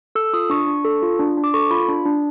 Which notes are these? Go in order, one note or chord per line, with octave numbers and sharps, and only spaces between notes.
A4 E6
F4 D#6
D4 C#6
D4
A4
F4
D4
D4
D6
A4 C#6
F4 B5
D4
D4